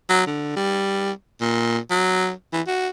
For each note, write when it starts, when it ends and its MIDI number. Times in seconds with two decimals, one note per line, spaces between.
0.09 0.25 54
0.27 0.55 50
0.56 1.11 55
1.41 1.78 46
1.91 2.31 54
2.53 2.61 52
2.67 2.89 66